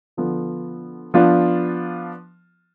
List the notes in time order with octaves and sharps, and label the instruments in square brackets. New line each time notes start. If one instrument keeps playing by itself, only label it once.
[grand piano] D3 F3 B3
F3 B3 D4 F4